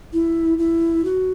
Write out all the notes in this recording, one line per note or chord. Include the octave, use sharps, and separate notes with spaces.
E4
E4
F#4